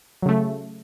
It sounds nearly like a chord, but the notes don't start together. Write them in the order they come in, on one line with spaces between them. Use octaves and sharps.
F#3 C#3 A3